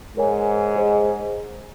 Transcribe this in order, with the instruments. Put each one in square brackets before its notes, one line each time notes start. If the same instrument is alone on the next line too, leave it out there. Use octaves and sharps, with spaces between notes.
[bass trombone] G#2 [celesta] A#4 C#5 G#5
[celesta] G#4 C5 D#5